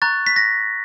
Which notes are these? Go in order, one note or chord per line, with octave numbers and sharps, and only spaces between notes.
A#5 C#6 F#6 A6
B6
A#6